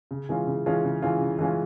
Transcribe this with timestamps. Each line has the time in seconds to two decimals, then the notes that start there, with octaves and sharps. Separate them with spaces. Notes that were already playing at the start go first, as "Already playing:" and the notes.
0.11 C#3
0.29 E3 G#3 C#4 F4
0.47 C#3
0.66 E3 G#3 C#4 F4
0.84 C#3
1.02 E3 G#3 C#4 F4
1.21 C#3
1.39 E3 G#3 C#4 F4